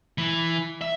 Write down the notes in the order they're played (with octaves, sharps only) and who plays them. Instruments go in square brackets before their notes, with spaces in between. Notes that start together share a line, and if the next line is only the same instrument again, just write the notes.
[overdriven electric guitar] E3
E5